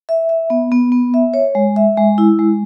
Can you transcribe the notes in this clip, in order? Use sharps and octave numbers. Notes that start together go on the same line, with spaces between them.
E5
E5
B3
B3
B3
E5
C#5
G#3
E5
G#3
E4
G#3